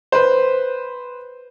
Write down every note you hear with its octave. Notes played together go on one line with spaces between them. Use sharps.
B4 C5